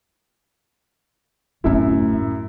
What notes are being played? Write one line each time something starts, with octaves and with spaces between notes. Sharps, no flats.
D1 F#2 A2 E4